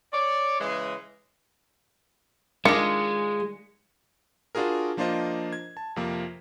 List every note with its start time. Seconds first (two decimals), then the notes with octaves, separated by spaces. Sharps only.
0.12 C#5 D5
0.60 C#3 E3 G#3
2.65 D#3 G#3 D4 F4 C#7
4.55 D4 F4 F#4 G#4 A#4
4.97 F3 A#3 D4 F4 C5 D#5
5.53 G#6
5.77 A5
5.96 F2 C3 F3 A#3